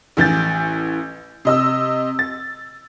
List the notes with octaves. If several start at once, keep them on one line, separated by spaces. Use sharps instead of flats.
A1 E3 G6 A6
C3 D#5 E6
A6